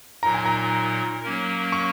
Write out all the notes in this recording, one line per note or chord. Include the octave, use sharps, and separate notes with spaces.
A#2 F#3 D#4 A#4 A#5
G#5
A#5
F#3 A#3 C#4 A#4
C#6